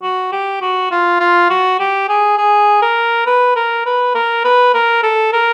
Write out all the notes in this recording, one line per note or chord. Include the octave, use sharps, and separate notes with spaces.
F#4
G4
F#4
F4
F4
F#4
G4
G#4
G#4
A#4
B4
A#4
B4
A#4
B4
A#4
A4
A#4